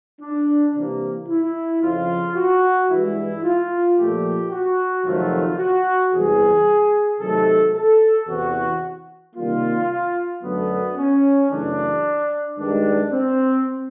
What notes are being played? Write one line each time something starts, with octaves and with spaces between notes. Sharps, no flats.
D4
C3 E3 G3 A#3
E4
F2 C#3 F3 F4
F#4
G2 E3 G#3 E4
F4
A#2 F3 A3 G4
F#4
F2 C3 D#3 F#3 A3 F4
F#4
E2 C3 E3 G3 G#4
C3 D#3 F#3 A3 A4
A4
E2 C3 E3 F#4
C3 D#3 G3 A#3 F4
F#2 D3 F#3 A3 B3
C#4
F#2 C#3 E3 A3 D4
G2 D#3 G#3 D4
C4